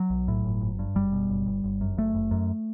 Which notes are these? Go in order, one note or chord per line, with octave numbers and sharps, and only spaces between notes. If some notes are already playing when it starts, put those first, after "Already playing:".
Already playing: F#3
B1
A2
G1
G1
G2
F#1 G3
B2
F#1
G1
G1
F#2
F#1 A3
F#1
F#2